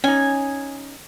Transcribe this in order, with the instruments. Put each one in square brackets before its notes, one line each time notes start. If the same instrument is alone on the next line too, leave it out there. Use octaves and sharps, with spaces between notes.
[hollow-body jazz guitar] C#4 D#4 [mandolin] G#5